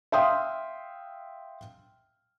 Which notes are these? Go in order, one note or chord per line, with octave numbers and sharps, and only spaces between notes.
E5 F5 G5 C6 D#6